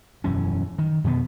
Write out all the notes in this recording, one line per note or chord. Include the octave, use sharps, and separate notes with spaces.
E1 F#2 E3 C#4
D#3
F2 B2 B3